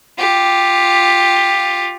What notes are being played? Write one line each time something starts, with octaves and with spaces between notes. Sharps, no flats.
F4 G4